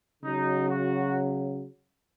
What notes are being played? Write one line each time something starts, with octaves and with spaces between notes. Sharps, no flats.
C#3 F#3 D#4
F#4